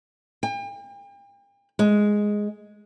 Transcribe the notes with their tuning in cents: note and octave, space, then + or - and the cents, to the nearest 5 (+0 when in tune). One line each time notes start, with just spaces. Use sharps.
G5 +40
G#3 +0